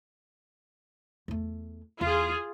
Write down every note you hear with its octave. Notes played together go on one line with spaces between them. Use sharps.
E2 A3
E2 F4 G#4